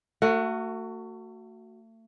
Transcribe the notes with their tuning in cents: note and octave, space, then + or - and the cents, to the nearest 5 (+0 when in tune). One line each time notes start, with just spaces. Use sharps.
A3 +35 F#4 +0